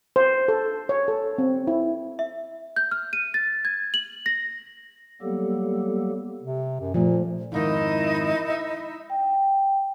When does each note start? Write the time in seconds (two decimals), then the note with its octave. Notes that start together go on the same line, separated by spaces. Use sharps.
0.16 C5
0.48 A4
0.89 C#5
1.08 A4
1.38 C4
1.67 E4
2.19 E5
2.76 G6
2.91 F6
3.13 D#7
3.34 A6
3.65 G#6
3.94 F#7
4.26 A#6
5.22 F#3 G3 A#3 B3 G4 A4
6.42 C3
6.81 F#2
6.94 A#2 F3 A3
7.52 F2 G#2 D#3 D#4 E4 D#5
8.50 E5
9.10 G5